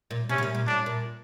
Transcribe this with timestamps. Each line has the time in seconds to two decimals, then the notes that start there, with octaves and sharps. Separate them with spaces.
0.11 A#2
0.29 C3 C#4
0.38 B2
0.43 A#2
0.55 A#2
0.67 A2 D4
0.86 A#2